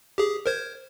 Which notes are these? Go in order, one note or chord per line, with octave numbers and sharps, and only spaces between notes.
G4 G#4
A#4 C5 G#6